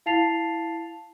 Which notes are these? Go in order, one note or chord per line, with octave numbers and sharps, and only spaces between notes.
E4 F5 A5 A6 C7 F7